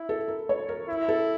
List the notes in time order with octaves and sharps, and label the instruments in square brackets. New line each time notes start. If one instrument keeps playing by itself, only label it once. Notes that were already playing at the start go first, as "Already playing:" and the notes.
Already playing: [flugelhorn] E4
[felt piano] A4
A#4
C#5
A#4
[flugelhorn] E4
[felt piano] A4